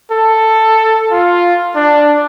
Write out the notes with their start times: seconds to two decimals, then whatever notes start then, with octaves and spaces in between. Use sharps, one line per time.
0.11 A4
1.12 F4
1.76 D4